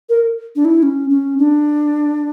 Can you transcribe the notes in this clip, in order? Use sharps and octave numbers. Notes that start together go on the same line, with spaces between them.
A#4
D4
E4
C#4
C#4
D4